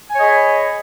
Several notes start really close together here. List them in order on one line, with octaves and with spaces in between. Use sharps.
G#5 C#5 D#5 G#4 B5